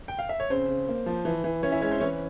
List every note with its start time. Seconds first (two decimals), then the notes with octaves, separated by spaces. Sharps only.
0.08 G5
0.19 F5
0.29 E5
0.40 C#5
0.50 C#3 C4 C5
0.69 C#3
0.88 A#3
1.06 F3
1.25 E3
1.44 E3
1.63 E3 C#4 C#5
1.72 E4 E5
1.81 G#3 C#4 C#5
1.91 C4 C5
2.00 E3 C#4 C#5